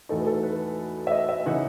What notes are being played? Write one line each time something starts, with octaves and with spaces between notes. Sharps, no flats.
E2 B2 A3 D#4 A4
B4
A4
B4
E5
D#5
E5
C#3 E3 B3 D#4 F#5